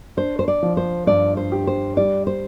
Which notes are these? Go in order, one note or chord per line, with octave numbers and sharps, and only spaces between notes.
D4 C5
C5
D5
F3
C5
G2 D5
C5
G4
C5
G3 D5
C5